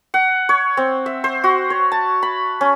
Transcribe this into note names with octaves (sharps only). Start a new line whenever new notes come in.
F#5
C#5
C4
E5
C5
F#4
C#5
A5
B5
C#4